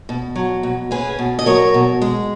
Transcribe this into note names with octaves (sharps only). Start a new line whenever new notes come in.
B2
F#3
B2
C#4 G#4 B4
B2
D#5
F#3 A#4 C#5
B2
G#3